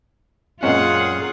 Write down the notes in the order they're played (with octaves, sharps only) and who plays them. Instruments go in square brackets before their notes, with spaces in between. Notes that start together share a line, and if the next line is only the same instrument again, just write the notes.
[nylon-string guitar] F#2 G#3 C4 [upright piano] A#2 C#4 [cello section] F4 G#4 [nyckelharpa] F#5